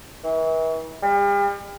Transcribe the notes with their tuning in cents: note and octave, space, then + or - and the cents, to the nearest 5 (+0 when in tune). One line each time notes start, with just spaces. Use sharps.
E3 -40
G3 +40